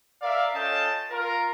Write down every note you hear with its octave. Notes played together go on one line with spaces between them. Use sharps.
A#4 D5 E5 F5
C#4 F4 A4 D#5 G5 A5
F4 A#4